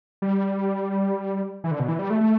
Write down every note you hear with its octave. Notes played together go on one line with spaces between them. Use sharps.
G3
E3
D3
B2
E3
G3
A3
A3